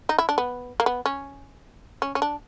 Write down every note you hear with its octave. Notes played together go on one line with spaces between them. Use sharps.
D#4
E4
D4
B3
A#3
B3
C#4
C#4
C#4
D4